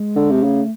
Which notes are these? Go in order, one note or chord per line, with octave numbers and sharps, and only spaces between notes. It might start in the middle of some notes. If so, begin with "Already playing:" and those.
Already playing: G#3
D3
C3
C#3 A3